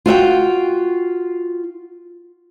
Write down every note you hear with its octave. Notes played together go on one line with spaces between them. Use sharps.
F4 F#4 E5 G5